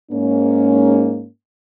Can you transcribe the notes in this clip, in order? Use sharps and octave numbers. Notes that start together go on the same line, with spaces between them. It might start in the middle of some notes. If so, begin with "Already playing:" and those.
G#2 A#3 C#4